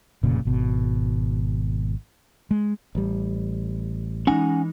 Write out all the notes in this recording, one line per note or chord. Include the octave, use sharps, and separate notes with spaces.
F1 A#2 C#3
G#1 B2
G#3
A1 G3
E3 G#3 C#4 D#4 F#5 G#5